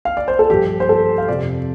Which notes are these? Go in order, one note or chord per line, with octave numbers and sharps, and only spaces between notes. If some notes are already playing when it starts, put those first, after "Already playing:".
F5
D5
C5
A4
G2 F3 G4
C5
A4
F5
F2 C3 F3 D5